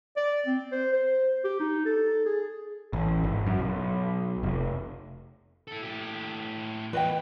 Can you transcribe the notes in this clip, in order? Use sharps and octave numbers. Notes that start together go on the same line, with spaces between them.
D5
C4
C5
C5
G4
D#4
A4
G#4
A1
G#1
F#2
B1
F1
E4 A4
A2 G4
E2 B4 D#5 G5